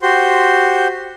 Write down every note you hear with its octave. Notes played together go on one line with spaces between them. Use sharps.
F#4 G4 C5 C6